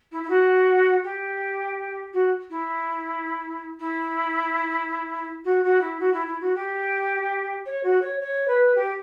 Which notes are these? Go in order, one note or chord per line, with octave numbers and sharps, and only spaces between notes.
E4
E4
F#4
G4
F#4
E4
E4
F#4
F#4
E4
F#4
E4
E4
F#4
G4
C#5
F#4
C#5
C#5
B4
G4